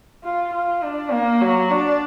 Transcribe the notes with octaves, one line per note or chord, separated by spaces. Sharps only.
F4
F4
D4
A#3
F#3
D4